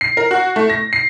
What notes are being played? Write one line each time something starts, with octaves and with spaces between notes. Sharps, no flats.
C7
A#4
F#4
A3
A#6
C7